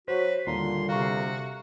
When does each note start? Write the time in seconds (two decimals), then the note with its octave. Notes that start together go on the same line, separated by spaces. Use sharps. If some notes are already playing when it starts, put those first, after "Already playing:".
0.08 F#3 F#4 B4 C5
0.47 D#2 A#2 D3 G3 F4 A#5 C6
0.89 C3 F#4 F5 A#5 C#6